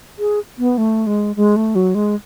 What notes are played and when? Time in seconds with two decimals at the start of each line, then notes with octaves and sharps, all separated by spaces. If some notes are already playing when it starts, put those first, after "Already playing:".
0.19 G#4
0.58 B3
0.78 A3
1.07 G#3
1.36 G#3
1.56 A3
1.75 F#3
1.95 G#3